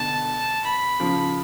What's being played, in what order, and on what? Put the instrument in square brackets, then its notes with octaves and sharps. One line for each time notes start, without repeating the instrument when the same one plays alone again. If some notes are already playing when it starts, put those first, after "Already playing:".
Already playing: [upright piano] B2 D3 [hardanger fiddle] A5
[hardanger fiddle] B5
[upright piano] C#3 F3